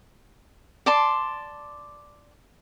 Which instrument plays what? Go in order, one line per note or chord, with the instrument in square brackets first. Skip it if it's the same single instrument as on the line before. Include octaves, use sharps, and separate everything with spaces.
[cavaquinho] D5 A5 C6